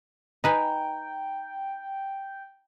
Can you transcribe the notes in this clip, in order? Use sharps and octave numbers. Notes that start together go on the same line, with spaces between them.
D#4 B4 G5 G#5 A#5